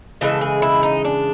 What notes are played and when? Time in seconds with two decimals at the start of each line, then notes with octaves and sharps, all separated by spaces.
0.21 C#3 E3 G#3 A4
0.41 G#4
0.62 E4
0.83 D#4
1.05 D4